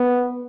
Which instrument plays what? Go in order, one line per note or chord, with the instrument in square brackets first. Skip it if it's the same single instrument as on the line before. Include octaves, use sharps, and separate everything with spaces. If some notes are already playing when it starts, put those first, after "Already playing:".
Already playing: [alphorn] B3